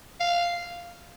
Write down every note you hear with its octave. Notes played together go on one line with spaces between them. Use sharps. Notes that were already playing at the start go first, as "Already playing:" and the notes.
F5